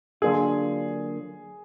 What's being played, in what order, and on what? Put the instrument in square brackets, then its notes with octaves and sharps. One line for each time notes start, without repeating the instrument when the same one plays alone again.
[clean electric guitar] D3 F#3 A#3 D4 F4 [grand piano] G#4